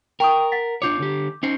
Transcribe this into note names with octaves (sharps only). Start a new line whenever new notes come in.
A#4 G5 C#6 D#6
F#5 A6 B6
D4 F4 C#5 D6 G6
D3 G4
C#4 D#4 C5